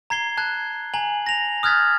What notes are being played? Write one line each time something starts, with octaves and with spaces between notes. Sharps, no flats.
A#5 G#6 C7 G7
A5 F#6 G#6
G#5 A#5 F#7
A#6 F7
D#6 F6 F#6 G#6 A6 B6